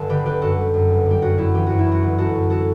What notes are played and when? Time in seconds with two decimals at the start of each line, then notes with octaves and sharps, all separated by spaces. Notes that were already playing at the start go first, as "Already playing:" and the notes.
Already playing: G1 A4
0.09 D3 G4 B4
0.26 D3 G4 B4
0.41 F#2 F#4 A4
0.58 G3
0.74 F#2
0.90 G1
1.06 G3 G4
1.22 F#2 F#4
1.37 F#2 E4
1.54 E3 G4
1.66 F#2 F#4
1.79 E4
1.87 F#2
1.92 F#4
2.03 G1
2.18 F#2 F#4 A4
2.35 F#2
2.50 F#4 A4